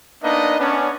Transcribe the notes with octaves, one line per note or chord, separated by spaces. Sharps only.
A#3 B3 D4 D#4 B4 D#5
B3 C#4 D4